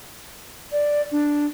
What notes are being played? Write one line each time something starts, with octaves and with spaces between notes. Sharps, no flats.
D5
D4